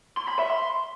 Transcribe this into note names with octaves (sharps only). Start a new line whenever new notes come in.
C6
B5
E5
C6